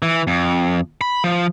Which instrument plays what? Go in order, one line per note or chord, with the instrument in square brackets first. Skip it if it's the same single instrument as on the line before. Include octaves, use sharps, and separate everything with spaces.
[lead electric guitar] E3
F2
B5
F3